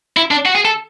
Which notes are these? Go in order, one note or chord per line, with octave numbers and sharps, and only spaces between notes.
E4
D4
F#4
G#4
A4